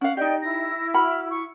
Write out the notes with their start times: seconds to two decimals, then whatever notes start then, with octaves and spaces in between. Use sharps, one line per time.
0.01 C#4 F5 F#5
0.17 D#4 G4 D5 D#5 G5 G6
0.42 E4 A#6
0.94 F#4 F#5 B5 F6
1.30 C#6